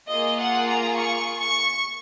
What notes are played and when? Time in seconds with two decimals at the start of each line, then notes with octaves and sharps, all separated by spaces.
0.11 A#3 F4 G#4 D#5
0.40 F#5
0.69 A#5
0.97 C#6
1.39 C#6